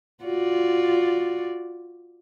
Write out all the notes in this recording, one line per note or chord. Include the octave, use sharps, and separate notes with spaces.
F4 F#4 D5